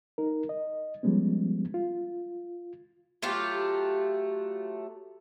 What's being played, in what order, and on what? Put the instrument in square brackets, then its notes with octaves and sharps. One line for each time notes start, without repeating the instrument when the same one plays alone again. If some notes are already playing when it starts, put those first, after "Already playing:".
[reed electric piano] D#4 A#4
D#5
F3 G3 G#3 B3 C#4
F4
[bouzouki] F#3 A3 F4 G4